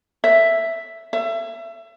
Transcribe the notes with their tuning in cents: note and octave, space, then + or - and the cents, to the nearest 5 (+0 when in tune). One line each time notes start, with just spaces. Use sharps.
E5 +5
E5 +30